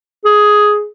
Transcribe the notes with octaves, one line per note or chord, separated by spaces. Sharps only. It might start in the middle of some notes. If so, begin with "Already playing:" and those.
G#4